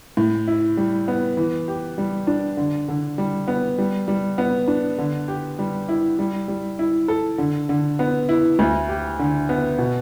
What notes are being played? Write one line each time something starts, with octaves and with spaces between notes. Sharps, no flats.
A2
E4
G3
B3
E3
G4
G3
D4
D3
D3
G3
B3
G3
G3
B3
D4
D3
G4
G3
E4
G3
G3
E4
A4
D3
D3
B3
E4
D2
G4
D3
B3
B2